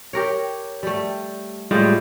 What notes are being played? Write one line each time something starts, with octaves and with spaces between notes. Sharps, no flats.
G4 A#4 C#5
G3 A3
A2 G3 G#3 F4